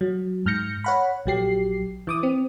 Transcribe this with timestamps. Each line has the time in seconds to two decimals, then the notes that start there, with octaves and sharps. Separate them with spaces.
0.01 F#3
0.46 G#2 F6 G6 A#6 C#7
0.84 C#5 F#5 B5
1.26 A#1 F#3 G4 C7
2.07 E3 D6 D#6
2.23 C4